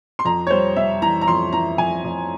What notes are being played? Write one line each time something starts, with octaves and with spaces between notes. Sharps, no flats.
C6
F2 A#5
C#5
G3 C5
G3 E5
E3 A#5
A#5
F2 C6
E3 A#5
F2 G#5
F2